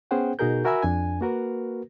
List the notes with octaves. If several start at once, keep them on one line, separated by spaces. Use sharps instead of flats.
B3 C#4 G#4 C5 F#5 G5
B2 D#4 F#4 G#4 A#4 G6
F#4 A#4 E5 G#5 B5 E6
F2 D4 G#5
A#3 F#4 A#4 B4